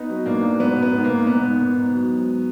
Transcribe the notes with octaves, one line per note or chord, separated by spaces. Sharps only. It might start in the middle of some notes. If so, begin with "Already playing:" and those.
Already playing: B3 D#4
F#3
G#2 A#3 D4
F#3
G#2 B3
G#2
B3
G#2
A#3
G#2
G#2 B3
G#2
G#2
G#2
F#3
F#3